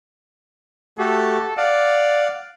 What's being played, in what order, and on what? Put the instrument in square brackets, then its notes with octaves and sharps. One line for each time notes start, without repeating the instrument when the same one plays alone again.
[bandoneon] A3 F#4 G4 [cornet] A4
[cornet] D5 [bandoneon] F5 F#5